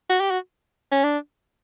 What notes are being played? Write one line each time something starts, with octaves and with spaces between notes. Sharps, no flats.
F#4
G4
F#4
C#4
D4